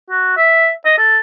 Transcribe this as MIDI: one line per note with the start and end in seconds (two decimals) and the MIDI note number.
0.10 0.34 66
0.37 0.71 76
0.85 0.94 75
0.98 1.19 69